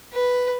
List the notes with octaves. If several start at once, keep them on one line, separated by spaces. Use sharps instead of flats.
B4